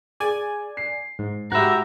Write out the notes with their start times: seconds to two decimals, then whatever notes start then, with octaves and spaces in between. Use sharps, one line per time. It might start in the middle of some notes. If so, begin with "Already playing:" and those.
0.20 G#4 D5 G#5
0.77 C7
1.19 G#2
1.52 G#2 F#4 G4 E5 A#5 B5 F#6